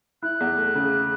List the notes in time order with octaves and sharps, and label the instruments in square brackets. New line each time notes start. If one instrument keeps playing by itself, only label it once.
[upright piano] E4 [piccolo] F#6
[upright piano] E2
A3
C#3